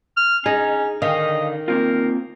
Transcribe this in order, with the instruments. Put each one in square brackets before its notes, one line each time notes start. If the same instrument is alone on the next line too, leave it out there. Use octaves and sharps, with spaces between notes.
[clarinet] F6
[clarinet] C#4 [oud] D#4 [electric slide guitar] G#4
[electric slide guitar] D3 F5 [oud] D#3 [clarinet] D#5
[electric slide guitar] A#3 C4 F4 [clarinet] A#4